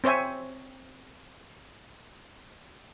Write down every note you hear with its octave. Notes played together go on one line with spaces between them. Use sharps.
C4 C5 C#5 E5 G#5